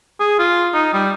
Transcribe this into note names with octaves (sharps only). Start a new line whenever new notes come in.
G#4
F4
D#4
G3